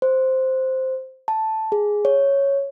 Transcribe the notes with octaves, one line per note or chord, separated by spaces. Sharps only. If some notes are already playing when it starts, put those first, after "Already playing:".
C5
A5
G#4
C#5